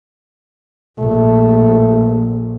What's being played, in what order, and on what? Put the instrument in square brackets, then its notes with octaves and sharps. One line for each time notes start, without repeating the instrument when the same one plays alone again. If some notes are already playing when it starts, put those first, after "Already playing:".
[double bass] A#1 [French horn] A3